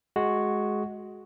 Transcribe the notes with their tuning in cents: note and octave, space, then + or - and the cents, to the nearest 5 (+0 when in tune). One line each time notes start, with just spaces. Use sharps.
G#3 +10 F#4 +0